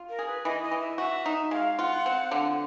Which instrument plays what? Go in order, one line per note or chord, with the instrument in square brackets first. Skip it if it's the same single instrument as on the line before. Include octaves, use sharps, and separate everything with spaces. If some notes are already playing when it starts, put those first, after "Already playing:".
Already playing: [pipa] F4
[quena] A#4
[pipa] G#4
[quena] B4
[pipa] E3 [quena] D#5
[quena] D#5
[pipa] E3
[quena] E5
[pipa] F#4 [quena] E5
[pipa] D#4
[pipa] G#3 [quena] F5
[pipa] F4 [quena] F#5
[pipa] C4
D3